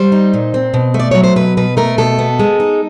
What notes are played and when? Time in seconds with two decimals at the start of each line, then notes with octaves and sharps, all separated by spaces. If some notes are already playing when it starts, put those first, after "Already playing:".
Already playing: G3 C5
0.12 D#4
0.33 A#2
0.54 C4
0.74 B2
0.94 A3
0.99 D5
1.11 F#3 C#5
1.24 C5
1.36 B2 B4
1.57 B2 B4
1.77 A3 A#4
1.98 B2 A4
2.19 B3
2.39 G#3
2.60 D#4